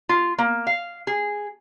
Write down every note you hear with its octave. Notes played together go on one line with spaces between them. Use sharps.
F4
A#3
F5
G#4